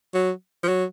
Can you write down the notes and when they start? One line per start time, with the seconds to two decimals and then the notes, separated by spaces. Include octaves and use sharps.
0.15 F#3
0.63 F3
0.68 F#3